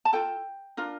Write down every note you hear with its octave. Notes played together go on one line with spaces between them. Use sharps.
A5
F4 A4 G5
D4 F4 A#4